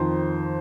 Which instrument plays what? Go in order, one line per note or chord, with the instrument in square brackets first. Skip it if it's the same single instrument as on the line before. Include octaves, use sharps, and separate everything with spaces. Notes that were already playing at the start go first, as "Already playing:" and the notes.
Already playing: [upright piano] F2 D#3 C5